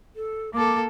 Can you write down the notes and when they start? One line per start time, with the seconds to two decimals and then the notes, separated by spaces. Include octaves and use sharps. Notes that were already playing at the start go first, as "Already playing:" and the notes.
0.16 A4
0.54 A#3 A4 D6